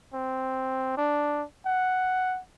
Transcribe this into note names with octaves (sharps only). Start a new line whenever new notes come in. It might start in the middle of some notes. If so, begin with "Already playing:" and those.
C4
D4
F#5